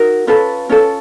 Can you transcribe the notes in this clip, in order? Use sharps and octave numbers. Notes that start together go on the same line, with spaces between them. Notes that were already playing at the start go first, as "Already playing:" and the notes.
Already playing: D#4 F#4 A#4
C#4 F4 A4 B4
C#4 F4 A4